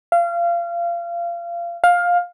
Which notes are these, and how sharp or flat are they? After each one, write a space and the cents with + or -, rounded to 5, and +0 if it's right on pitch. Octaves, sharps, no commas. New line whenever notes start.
F5 -25
F5 +15